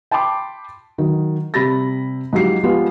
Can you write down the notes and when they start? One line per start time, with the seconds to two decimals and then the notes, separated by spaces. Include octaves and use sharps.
0.11 G5 A5 B5 C6 D6
0.98 D#3 F#3
1.54 C3 G3 B5 A6 A#6
2.33 G#2 F3 F#3 G4 C7
2.63 F3 G3 G#3 B3 F4 G4